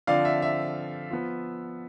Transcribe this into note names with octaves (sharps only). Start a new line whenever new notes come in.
D3 F3 C4 D5 F5
E5
E5
F3 B3 F4